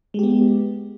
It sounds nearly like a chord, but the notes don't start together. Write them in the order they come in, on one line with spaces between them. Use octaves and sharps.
G#3 G4 B3